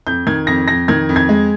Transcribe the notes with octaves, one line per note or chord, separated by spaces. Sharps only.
F2 G6
D#3 G#6
F2 A#6
F2 A#6
D#3 G#6
F2
G#6
G#3